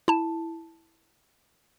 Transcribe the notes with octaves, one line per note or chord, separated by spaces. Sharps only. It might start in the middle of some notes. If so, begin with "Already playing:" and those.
E4 A5